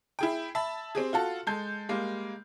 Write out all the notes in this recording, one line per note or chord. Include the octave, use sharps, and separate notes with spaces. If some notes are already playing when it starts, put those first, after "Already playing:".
E4 G#4 G5
E5 A5 B5
C4 G4 G#4
F4 F#4 A4
G#3 A4 G6
G3 G#3 A#3